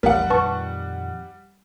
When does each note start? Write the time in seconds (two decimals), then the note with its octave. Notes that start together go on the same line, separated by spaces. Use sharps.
0.03 A1 D#2 G3 A#4 F#5
0.30 F2 A#2 D#3 B4 A5 C#6